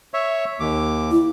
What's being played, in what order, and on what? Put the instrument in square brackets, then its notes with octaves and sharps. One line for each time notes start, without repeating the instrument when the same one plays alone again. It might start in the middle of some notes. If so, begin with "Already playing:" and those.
[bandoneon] C#5 E5
D#2 D6
[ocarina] E4